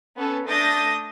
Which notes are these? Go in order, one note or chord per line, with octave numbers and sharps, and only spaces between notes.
B3 C#4 A4
A3 D4 D#6 G6 A6 A#6